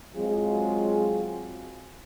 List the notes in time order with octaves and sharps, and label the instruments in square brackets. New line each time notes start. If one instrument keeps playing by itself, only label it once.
[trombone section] F#3 G#3 C4 F4 F#4 G#4